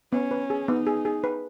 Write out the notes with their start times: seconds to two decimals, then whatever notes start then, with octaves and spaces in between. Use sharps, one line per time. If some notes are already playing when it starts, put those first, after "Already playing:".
0.13 B3 C#4
0.31 B4
0.50 G#4
0.68 B3 D#4
0.87 G#4
1.05 G#4
1.24 B4